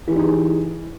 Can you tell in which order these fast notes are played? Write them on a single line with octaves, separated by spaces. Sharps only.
E3 G4 D#4 G#4